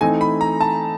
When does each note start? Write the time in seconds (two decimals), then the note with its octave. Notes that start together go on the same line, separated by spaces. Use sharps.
0.01 E3 A3 C4 D#4 G#5
0.21 B5
0.41 A#5
0.61 A5